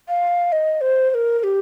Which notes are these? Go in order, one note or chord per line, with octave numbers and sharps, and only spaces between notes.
F5
D#5
C5
C5
A#4
A#4
G4